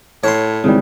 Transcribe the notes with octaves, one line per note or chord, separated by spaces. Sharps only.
A2 C#5 C6
G#1 C#3 E3 G3